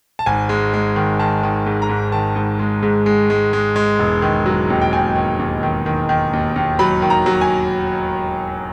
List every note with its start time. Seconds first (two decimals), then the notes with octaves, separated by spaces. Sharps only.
0.19 A5
0.26 G#1 G#5
0.49 G#3
0.74 G#3
0.96 D#3
1.19 D#3 A5
1.43 D#3
1.66 G#2
1.82 A#5
1.89 G#2
2.12 D#3 A5
2.36 G#2
2.59 G#3
2.83 G#2
3.06 G#3
3.30 G#3
3.53 G#3
3.76 G#3
3.99 E1
4.22 D#3
4.46 F#3
4.70 D#2
4.81 G5
4.92 D#2 G#5
5.16 D#3
5.39 D#2
5.63 D#3
5.86 D#3
6.09 D#3
6.33 D#2
6.56 D#2
6.79 F#3 B5
7.02 D#3
7.10 A#5
7.26 F#3
7.41 G#5